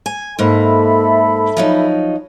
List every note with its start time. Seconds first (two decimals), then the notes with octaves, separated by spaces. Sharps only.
0.06 G#5
0.39 G#2 A#3 A4 E5 B5
1.57 F3 F#3 D#4